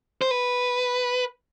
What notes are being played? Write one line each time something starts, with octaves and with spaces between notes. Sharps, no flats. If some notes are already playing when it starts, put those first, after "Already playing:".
C5
B4